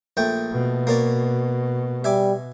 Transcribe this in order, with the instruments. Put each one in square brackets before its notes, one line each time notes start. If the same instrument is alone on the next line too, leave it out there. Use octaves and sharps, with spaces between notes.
[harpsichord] A#1 A3 G5
[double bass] B2
[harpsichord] A#3 C#4 D5
[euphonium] G3 [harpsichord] E5 G#5 D6